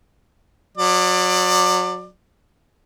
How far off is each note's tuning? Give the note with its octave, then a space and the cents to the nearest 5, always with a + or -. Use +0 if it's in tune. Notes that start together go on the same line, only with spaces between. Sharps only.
F#3 -25 D5 +20